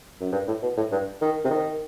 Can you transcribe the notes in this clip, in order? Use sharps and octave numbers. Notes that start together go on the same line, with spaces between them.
F#2
G2
A2
B2
A2
G2
D#3
C3
D#3